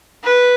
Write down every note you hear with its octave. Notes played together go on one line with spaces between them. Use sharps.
B4